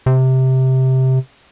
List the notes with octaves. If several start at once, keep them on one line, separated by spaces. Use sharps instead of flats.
C3